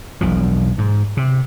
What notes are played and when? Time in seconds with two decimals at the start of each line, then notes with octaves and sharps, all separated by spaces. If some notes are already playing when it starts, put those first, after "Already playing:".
0.21 E1 B1 B2 F3
0.78 G#2
1.17 C3